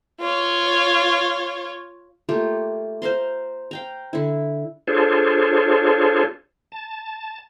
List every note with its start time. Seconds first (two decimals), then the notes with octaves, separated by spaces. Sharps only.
0.21 F4 C#5
2.29 A3 A#3 F4 G4
3.02 C5 F5 A#5 C6
3.71 F5 G5 A#5
4.13 D3 E4
4.88 D4 F4 G#4 A4 C5 C#5
6.72 A5